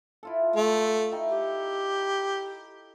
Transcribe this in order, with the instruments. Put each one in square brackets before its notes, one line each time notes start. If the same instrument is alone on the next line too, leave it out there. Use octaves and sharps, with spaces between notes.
[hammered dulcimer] E4 F4 A4
[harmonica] A3
[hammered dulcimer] D#4 E4 G5
[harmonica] G4